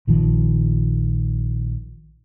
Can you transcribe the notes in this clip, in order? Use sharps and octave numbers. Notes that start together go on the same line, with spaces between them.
A#1 D#3 F3